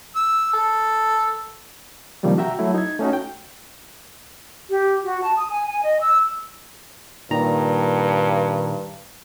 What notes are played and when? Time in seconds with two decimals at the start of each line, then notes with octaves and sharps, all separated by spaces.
0.16 E6
0.53 A4
2.23 C3 D#3 F3 G3 A#3
2.38 F#4 E5 G5 A#5
2.59 F#3 A3 E4
2.75 D#4 G#6
2.99 A3 C#4 D#4 F#4
3.13 G5
4.69 G4
5.04 F#4
5.22 A5
5.37 D#6
5.50 G#5
5.68 G#5
5.83 D#5
6.00 E6
7.31 G2 A#2 D#3 A#5